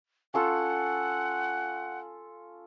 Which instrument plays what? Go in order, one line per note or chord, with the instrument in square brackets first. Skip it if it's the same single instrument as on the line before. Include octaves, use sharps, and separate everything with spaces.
[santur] C#4 F4 A4 [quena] F#5